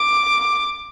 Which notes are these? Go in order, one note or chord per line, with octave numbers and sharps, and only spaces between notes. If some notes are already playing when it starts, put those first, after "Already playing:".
Already playing: D6